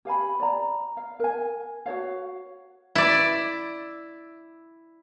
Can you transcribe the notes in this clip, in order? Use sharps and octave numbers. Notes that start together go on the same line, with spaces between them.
G4 F5 G#5 B5
D5 A#5
F5
A#4 G#5
F#4 C5 C#5 F5
E4 D5